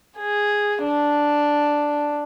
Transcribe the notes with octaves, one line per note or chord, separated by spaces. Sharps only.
G#4
D4